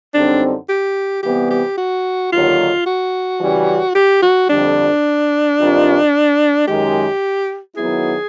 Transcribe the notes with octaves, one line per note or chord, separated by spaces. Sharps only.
F#2 D3 G3 C4 D4 D#4
G4
C3 E3 G3 B3 G4
G4
F#4
D#2 D3 F#3 F4
F#4
C#3 E3 G3
G4
F#4
F2 D3 G3 D4
G2 D#3 G3 C4 F4
F#2 D#3 G#3 G4
D#3 F#3 B3 E4 G#4